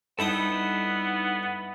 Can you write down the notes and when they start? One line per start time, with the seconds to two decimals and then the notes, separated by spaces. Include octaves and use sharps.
0.19 G2 B3 D#4 E4 A4 G5 D#6